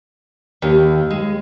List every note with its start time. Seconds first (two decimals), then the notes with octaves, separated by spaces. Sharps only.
0.62 D#2
1.10 G#3